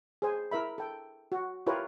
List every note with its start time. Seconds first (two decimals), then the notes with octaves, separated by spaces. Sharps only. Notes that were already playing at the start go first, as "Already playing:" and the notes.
0.22 G#4 C5 G#5
0.51 E4 A#4 E5 B5
0.78 A4 G5
1.32 F#4
1.67 E4 F4 G4 A#4 B4 C#5